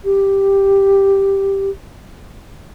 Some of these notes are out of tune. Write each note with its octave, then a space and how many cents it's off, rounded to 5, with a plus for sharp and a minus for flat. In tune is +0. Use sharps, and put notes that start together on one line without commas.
G4 +0